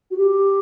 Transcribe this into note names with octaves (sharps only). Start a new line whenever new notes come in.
F#4
G4